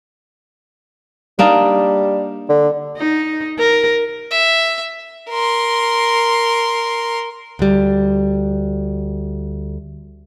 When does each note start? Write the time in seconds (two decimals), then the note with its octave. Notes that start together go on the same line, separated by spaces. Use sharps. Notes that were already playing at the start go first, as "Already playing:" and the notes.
1.39 G3 A#3 D4 D#4
2.49 D3
2.97 D#4
3.59 A#4
4.31 E5
5.30 A#4 C6
7.59 D2 G3